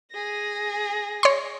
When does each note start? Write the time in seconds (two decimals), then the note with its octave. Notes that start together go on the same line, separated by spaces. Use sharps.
0.12 G#4 A#6
1.23 C#5 C6